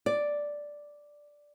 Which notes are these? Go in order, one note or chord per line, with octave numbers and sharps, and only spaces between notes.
D5